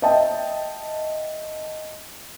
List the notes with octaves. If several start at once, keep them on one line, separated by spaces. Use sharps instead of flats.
D#5 E5 G5 A5